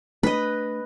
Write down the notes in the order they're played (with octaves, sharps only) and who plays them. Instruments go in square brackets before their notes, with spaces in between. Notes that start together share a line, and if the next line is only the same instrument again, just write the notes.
[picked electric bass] A3 D4 [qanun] B4 D#5